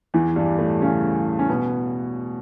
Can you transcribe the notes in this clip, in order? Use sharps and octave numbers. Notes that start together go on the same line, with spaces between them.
E2 E3
G2 G3
A2 A3
C#3 C#4
C#4
B2 B3